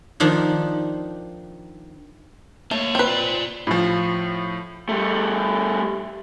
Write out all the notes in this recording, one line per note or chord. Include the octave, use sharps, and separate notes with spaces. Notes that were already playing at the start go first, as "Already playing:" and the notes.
D#3 F3 D4 D#4
A3 A#3 C#5
C4 B4
F4 D5
A2 F3
G3 A3